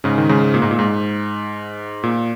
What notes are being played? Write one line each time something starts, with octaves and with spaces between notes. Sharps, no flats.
G#2 C#3
D#3
G#2 C#3
A#2
G#2
A#2
G#2
A#2